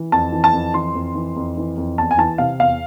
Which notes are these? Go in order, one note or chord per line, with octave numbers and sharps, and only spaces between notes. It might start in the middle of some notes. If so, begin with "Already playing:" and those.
Already playing: E3
F2 A5
E3
A5
F2
E3 C6
F2
E3
F2
E3
F2
E2 A5
G#5
E3 A5
C3 F5
E2 F5